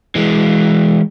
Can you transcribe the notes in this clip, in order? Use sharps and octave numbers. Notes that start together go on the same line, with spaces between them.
E3 G#3